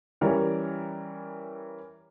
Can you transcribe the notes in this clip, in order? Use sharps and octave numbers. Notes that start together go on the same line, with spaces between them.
E3 G3 C#4 A#4 C#5 D5